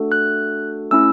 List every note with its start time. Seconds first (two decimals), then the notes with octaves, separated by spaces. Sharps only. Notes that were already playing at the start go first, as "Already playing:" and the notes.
Already playing: A3 D4 F#4 A4
0.12 F#6
0.91 A3 C#4 E4 E6